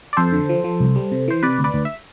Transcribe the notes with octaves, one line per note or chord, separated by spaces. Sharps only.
D5
F2 A4 C5
D3
F3
F3
C2
G3
C3
E3 C5
C3 B4 D5
D2
B4 D5
D2
E5